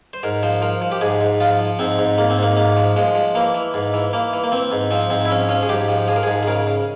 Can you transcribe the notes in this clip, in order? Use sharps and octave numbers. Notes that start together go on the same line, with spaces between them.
C5
G#2 A#4
F3 C5
F3 A#4
F3
G4
G#2 G#4
G#2
F3 F4
F3
G#2 C4
G#2
G#2 A#3
C4
G#2 A#3
G#2 A#3
F3
F3 G#3
F3
E3 A#3
E3
G#2
E3
E3 A#3
E3
A#3
E3 C4
G#2
F3 C4
G#2 C4
E4
F3 C#4
F3 C#4
G#4
G#2 G4
F3
F3 G#4
A#4
G#2 G#4
G#4
C#3 A#4
C#3